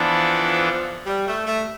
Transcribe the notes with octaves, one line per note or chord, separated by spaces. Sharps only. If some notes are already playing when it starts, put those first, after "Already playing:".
Already playing: E3 F3 B3 D4 A4
G3
A3
A3